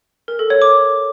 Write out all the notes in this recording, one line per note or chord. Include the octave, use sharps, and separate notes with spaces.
A#4
A4
C#5
D6